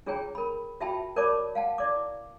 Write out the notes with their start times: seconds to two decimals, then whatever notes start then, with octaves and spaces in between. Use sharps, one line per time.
0.06 D4 F4 G#4 C#5 G5 A#5
0.35 A#4 B5
0.80 F4 F#4 E5 G5 A5 B5
1.16 A#4 C#5 D5 A5 B5 D6
1.55 F5 F#5 A5
1.78 E4 D5 D6